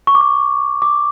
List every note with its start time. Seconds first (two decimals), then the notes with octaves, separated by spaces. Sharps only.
0.07 C#6
0.15 D6
0.21 C#6
0.82 D6